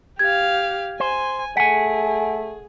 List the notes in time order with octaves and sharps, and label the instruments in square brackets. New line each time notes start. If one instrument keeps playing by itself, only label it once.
[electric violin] G4 F5 [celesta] G#6
[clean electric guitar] C5 [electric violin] G#5
[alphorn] A3 [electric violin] G#4 [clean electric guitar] F#5 G#5 [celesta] B6